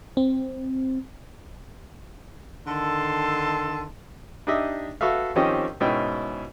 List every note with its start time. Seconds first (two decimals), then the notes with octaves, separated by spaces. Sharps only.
0.17 C4
2.67 D3 D#3 A4 A5 C6
4.47 D4 D#4 G4 D#5 E5
5.01 F#4 A4 B4 E5 F5
5.36 D#3 F3 C4 C#4 G4 D#5
5.80 G#2 B2 C#4 E4 G5